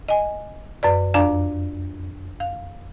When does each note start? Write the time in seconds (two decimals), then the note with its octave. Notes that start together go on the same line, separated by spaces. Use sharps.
0.08 D#5 G#5
0.83 F#2 B4 D5
1.14 F2 D4 D5 F5 A#5
2.40 F5